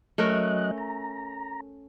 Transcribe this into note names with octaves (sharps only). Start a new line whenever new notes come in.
F#3 A3 C#4 A#4 D#5 F#6
A#5